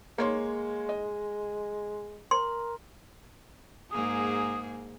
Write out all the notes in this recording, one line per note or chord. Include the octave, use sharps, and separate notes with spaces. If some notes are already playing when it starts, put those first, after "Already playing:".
G#3 A#3 C#5 C6
D#5
A#4 C6
G#2 A#3 G#4 D#6